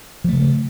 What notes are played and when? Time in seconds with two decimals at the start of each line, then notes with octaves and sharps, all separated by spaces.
0.24 F3
0.29 A3
0.33 C#3